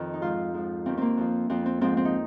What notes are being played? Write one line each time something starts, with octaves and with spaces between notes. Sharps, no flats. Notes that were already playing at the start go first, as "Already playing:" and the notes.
Already playing: F2 D#3
D#4
G#2 F3 F4
G#2 F3
D#2 D#3 C4
A#3 C4
F2 F3
F2 F3 C4
C4
G#2 F3 C4
C4
D#4